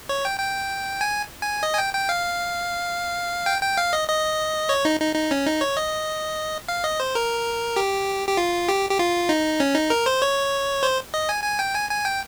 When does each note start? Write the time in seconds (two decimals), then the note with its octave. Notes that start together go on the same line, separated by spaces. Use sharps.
0.09 C#5
0.25 G5
0.40 G5
1.01 G#5
1.42 G#5
1.63 D#5
1.73 G#5
1.78 G5
1.94 G5
2.09 F5
3.46 G5
3.62 G5
3.77 F5
3.93 D#5
4.09 D#5
4.69 C#5
4.85 D#4
5.00 D#4
5.15 D#4
5.31 C#4
5.46 D#4
5.61 C#5
5.77 D#5
6.68 F5
6.84 D#5
7.00 C5
7.15 A#4
7.76 G4
8.28 G4
8.37 F4
8.69 G4
8.90 G4
8.99 F4
9.29 D#4
9.60 C#4
9.75 D#4
9.90 A#4
10.06 C5
10.22 C#5
10.83 C5
11.14 D#5
11.29 G#5
11.44 G#5
11.59 G5
11.75 G#5
11.90 G#5
12.05 G5